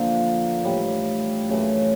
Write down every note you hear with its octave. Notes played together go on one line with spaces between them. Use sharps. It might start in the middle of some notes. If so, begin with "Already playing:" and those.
Already playing: D3 F3 A#3
A2 E3 G3
F#2 C#3 E3 A3